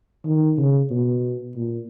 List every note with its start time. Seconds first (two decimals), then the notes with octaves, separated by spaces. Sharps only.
0.25 D#3
0.58 C#3
0.91 B2
1.55 A#2